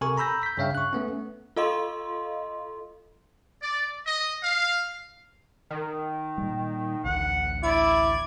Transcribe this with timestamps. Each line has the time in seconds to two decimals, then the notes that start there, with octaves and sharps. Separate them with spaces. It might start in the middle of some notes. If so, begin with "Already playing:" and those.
0.01 C3 A4 A#4 G#5 C#6
0.17 A#5 B5 E6 G6 A#6
0.43 G6 B6
0.57 G2 C#3 C#5 E5 F5 G5
0.75 C#6 F#6
0.93 A3 B3 C#4
1.56 F4 A4 D#5 F5 C6
3.62 D5
4.06 D#5
4.43 F5
5.70 D#3
6.38 A#2 G3
7.05 D1 A1 D2 F#5
7.63 E4 D5 G#6